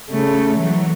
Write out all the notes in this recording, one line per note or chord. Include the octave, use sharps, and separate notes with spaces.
C#3 A3
E3 F#3